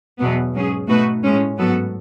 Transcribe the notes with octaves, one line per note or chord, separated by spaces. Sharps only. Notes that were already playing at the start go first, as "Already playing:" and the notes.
E2 B2 F#3 B3
G#2 F#3 C#4 G#4
B2 A3 D#4 F#4 B4
A2 G#3 C#4
G#2 F#3 B3 F#4 A4